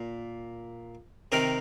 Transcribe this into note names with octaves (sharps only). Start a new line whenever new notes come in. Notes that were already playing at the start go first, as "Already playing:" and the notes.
Already playing: A#2
C3 D#3 A#4